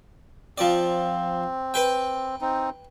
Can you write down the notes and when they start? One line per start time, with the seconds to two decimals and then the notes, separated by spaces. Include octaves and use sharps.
0.58 F3 C4 D5
1.74 B4 G5
2.41 C4 D#4